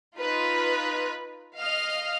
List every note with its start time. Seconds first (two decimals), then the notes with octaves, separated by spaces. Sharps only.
0.16 D#4 F4 B4
1.56 D#5 F5 F6